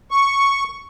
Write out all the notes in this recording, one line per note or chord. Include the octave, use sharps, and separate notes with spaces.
C#6